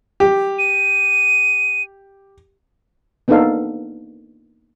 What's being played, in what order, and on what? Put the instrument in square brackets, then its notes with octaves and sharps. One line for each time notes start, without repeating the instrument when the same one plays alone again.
[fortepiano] G4
[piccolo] D#7
[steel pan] A#3 B3 D4 D#4 A4 F5